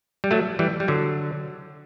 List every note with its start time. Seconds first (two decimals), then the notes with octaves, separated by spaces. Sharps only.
0.24 G3
0.31 F#3 A3
0.59 E3 G3
0.80 G3
0.88 D3 F#3